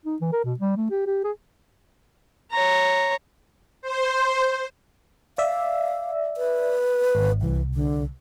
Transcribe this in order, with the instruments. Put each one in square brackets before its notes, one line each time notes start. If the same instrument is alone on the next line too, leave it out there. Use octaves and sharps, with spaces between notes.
[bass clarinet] D#4
E3
A#4
B2
G3
A3
G4
G4
G#4
[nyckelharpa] C#5 A#5
[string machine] C5
[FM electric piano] D5 E5 [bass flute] F5
[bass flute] B4
[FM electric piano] G#1
[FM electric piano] C2 [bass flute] E3
[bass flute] D3